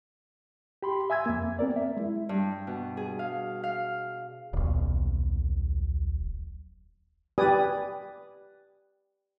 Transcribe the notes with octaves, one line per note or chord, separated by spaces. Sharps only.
G4 B5 C6
E5 G#5 E6 G#6
F2 A#3
B3 C4 A#4 D5
E5
G#3 E4
G2
B2
G#4
F5
F5
D#1 B1
G4 B4 D5 G#5 D#6